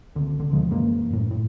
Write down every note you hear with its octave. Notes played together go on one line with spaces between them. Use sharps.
C2 D3
D3
D2 B2 F3 G#3
F#2 E3 G#3 A#3
F#2 A2
A2